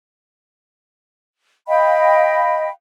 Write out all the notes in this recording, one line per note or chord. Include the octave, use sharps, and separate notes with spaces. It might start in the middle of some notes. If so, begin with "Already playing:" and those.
D#5 F5 G5 B5